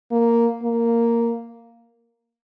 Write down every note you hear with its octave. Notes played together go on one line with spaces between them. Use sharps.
A#3
A#3